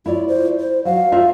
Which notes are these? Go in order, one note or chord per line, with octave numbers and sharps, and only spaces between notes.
E4 F4 C#5 D5
C5
C5
F#3 F5
D#4 F4 E5